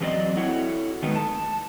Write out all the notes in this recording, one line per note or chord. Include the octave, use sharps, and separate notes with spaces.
E2 F#3 C4 D5 D#5
E4 F#4 A4 C#5 F#5
D#3 G#3 A3 B3
A5